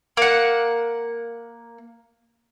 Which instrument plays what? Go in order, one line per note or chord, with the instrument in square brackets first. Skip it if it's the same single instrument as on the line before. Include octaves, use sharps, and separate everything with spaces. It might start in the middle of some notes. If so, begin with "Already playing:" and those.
[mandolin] A#3 F#5